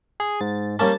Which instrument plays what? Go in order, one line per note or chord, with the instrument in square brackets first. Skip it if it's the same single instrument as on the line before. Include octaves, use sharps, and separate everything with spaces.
[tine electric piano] G#4
[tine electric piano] G#2 [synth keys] A6
[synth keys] G3 A5 [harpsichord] A#3 C#4